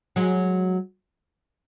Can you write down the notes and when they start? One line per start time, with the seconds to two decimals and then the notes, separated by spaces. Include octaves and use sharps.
0.16 F#3 G#3